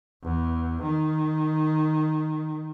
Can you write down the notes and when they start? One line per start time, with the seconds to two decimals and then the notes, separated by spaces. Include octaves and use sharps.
0.24 E2
0.83 D#3